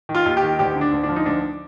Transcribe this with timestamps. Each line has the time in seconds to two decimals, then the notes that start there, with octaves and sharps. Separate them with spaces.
0.09 D#3
0.15 F4
0.26 D#2
0.37 G4
0.43 D#3
0.59 D2 G4
0.75 D3
0.81 D4
0.92 D2
1.03 D4
1.09 F3
1.16 D#4
1.26 D2 D4